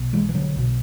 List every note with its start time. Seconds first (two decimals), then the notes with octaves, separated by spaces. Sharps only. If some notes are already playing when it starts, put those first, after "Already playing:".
Already playing: B1 B2
0.13 E3 G#3
0.29 E3
0.34 D3 F#3
0.56 B1 B2